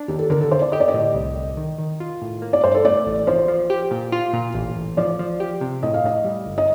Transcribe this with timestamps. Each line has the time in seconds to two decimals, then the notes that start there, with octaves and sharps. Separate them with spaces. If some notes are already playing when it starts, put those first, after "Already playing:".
Already playing: D4
0.08 D#2 G4
0.19 A4
0.30 D3 A#4
0.41 A4
0.51 D3 C5
0.62 D5
0.72 G4 D#5
0.80 D5
0.88 D#5
0.94 A2
1.14 C2
1.36 C2
1.57 D#3
1.78 D#3
2.00 F4
2.22 A2
2.42 A#3
2.53 D5
2.64 G2 C5
2.75 A4
2.85 A3 D5
3.06 A1
3.27 F3 C5
3.48 F3
3.70 G4
3.91 A#2
4.12 F4
4.33 A#2
4.54 A1
4.76 A1
4.97 F3 D5
5.19 F3
5.40 G4
5.61 C3
5.83 A2 D#5
5.94 F5
6.04 A2 D#5
6.24 G3
6.46 G1
6.58 D#5